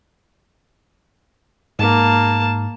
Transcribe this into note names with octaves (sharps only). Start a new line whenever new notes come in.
G#2 A#3 A5